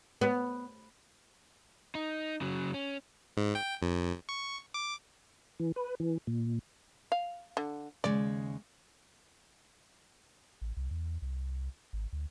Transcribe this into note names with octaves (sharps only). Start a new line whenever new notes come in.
B3
D#4
C#3 F#3
C#4
G#2
G5
F2
C#6
D6
E3
B4
E3
A#2
F5
D3
D#2 C#3 G#3 D5
A1
C2
E2
C2
G#1
D2